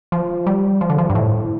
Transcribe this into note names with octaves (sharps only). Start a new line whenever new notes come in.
F3
G3
F3
D3
F3
G2
A2